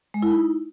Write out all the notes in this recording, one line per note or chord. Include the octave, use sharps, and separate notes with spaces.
G#3
E4
D#4